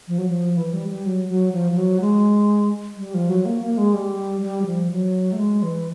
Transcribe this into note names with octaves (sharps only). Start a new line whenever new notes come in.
F3
F#3
F3
E3
G3
G3
F#3
F#3
F3
F3
F#3
G#3
G3
F3
F#3
A#3
A#3
G#3
G3
G3
F#3
F3
F#3
A3
G#3
E3